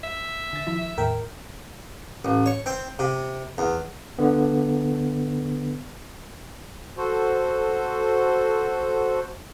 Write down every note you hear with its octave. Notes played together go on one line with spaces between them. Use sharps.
E5
D3 A6
D#3 F3 E4
E2 A2 D#3 A#4 G5
A1
C#5
C4
C3
E2
D3 B3
F#4 A4 C5